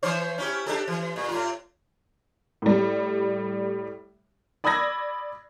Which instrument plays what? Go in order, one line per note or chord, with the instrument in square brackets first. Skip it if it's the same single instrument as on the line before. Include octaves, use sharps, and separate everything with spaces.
[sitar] E3 C5 C#5
C#4 E4 G4
D4 G4 A4
E3
A#2
A2 F4
[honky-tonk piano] A2 G3
D5 B5 D#6 E6 G#6 A#6